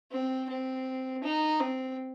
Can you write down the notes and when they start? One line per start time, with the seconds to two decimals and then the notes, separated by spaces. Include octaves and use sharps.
0.12 C4
0.49 C4
1.23 D#4
1.60 C4